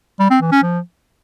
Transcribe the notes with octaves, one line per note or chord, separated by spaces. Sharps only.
G3
C4
E3
C#4
F3